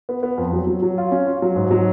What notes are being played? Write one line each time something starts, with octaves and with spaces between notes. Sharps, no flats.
B3
B3
F2
F#3
F#3
F#3
F4
C#4
F4
F#3
G#2
F#3